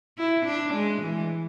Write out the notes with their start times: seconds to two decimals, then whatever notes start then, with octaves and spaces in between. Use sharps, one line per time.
0.18 E4
0.46 D4
0.74 G#3
1.02 E3